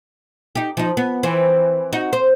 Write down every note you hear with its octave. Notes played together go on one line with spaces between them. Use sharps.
D#4 G4
F3 D#4
B3
E3 C4
D#4 F#4
C5